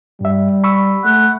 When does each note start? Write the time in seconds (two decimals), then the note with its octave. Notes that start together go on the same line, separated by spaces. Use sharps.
0.21 G2 G3 E5
0.64 B5 C#6 E6
1.05 A3 F#5